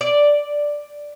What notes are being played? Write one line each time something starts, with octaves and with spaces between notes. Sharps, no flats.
D5